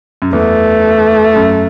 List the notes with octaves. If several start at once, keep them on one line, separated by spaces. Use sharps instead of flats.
F#2
E2 A3
F#2